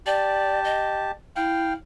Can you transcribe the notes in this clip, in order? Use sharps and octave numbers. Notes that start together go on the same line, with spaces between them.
G4 D5 A5
D#5
E4 F5 G5